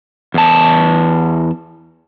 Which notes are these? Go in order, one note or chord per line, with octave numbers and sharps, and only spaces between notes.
E2 A5